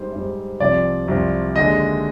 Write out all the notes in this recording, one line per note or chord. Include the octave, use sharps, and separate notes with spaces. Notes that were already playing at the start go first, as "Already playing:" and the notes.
Already playing: G#2 G3 C5
G#2 G3
C2 C3 F3 D5
C2 C3 F3
D#2 D3 G#3 D#5